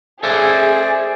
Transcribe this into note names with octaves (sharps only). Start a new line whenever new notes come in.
G#4 A4 C5 D5 E5 G#5